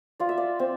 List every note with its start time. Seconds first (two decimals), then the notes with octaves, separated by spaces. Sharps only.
0.20 F4 D5
0.29 E5
0.38 D5
0.59 C4